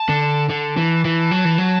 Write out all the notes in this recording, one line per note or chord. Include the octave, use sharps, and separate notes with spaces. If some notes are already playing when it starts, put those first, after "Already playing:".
Already playing: A5
D3
D3 A5
E3
E3
F#3
E3
F#3